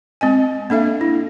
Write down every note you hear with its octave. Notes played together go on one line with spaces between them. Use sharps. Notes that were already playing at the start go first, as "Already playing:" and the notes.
G#3 C4 D#5 G#5
A#3 D4 A4 E5 F5
E4